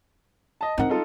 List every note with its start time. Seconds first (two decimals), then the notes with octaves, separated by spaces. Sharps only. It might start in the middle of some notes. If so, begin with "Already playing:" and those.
0.61 D#5 A5
0.78 G3 C4 D#4 A#4 F#5
0.89 D#4 F4 A4